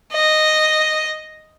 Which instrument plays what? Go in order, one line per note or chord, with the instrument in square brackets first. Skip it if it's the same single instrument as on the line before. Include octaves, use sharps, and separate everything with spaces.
[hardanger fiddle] D#5